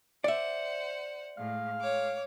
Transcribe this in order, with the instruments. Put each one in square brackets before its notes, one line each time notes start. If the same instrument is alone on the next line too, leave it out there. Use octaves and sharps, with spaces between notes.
[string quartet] C5 F#5 [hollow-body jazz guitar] D5 E5
[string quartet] A2 [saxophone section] G#3 F5
[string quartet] C#5 D6